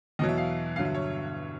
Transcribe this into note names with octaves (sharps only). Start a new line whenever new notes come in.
E2 B2 F#3 D#5
E5
F5
G2 D3 F#3 F5
E5
C#5